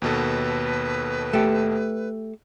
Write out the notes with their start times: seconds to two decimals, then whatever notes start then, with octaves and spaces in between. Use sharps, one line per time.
0.02 D#2 B2 A4 B4
1.33 A3 G4